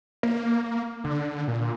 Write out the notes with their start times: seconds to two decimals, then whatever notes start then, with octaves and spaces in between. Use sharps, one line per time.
0.23 A#3
1.04 D3
1.48 A#2